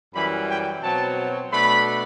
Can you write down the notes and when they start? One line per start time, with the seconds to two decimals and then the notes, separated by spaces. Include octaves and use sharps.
0.13 F#2 E3 G3 B5
0.47 G5
0.82 B2 F#3 C4 A5
1.51 B2 A3 D4 B5